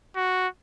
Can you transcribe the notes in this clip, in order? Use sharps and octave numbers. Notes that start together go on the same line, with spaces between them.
F#4